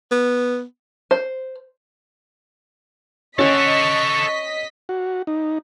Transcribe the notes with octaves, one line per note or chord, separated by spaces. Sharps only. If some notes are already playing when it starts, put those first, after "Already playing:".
B3
C5
C#4 A4 D#5 F#5 C#6 B6
F#4
D#4